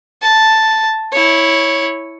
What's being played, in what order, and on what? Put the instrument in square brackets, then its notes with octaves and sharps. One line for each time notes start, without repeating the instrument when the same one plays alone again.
[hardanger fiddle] A5
E4 C#5